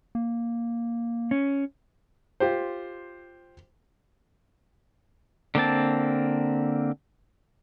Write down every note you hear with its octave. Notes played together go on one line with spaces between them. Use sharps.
A#3
C#4
F4 G4 C5
D3 A#3 C4 A5